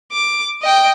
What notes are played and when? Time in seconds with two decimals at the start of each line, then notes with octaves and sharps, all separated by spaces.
0.12 D6
0.62 D#5 G5